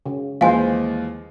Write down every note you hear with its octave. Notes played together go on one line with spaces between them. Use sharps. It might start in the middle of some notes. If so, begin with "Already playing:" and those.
C#3
D#2 E3 F3 G#3 C5 F5 G#5